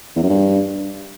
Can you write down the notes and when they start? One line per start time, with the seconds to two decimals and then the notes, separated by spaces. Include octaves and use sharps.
0.16 E2
0.23 F#2
0.30 G2